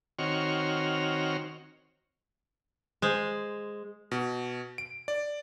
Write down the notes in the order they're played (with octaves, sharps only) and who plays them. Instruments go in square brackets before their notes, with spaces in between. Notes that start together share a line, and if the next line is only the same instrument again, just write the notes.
[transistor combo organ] D#3 C4 F#4 C#5 F6
[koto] G#3 C5
[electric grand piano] B2
D7
D5